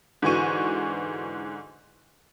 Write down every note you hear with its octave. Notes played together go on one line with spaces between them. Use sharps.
G#2 D3 E3 F#4 C#6 D#7